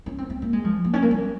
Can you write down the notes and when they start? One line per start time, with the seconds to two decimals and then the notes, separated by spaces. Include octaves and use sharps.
0.06 C#4
0.18 C4
0.30 C4
0.42 A#3
0.53 G#3
0.64 F3
0.85 A#3
0.93 C#4
1.02 A#3
1.11 G3